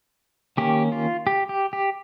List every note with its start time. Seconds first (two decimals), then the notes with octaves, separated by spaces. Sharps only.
0.57 D#3 A#3 C#4 G4
0.92 F4
1.27 G4
1.49 G4
1.73 G4